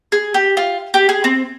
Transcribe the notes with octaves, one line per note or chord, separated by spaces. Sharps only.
G#4
G4
F4
G4
G#4
C4